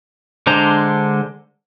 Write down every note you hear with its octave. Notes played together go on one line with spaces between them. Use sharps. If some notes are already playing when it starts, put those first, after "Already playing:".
D3 G#3 D4 C5 A#5